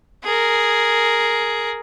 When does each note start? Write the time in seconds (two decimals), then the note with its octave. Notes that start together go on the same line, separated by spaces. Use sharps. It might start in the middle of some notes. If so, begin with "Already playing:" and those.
0.24 G#4 A#4